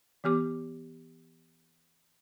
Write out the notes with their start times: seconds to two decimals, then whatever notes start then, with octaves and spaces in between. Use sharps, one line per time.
0.24 E3 B3 G4 D6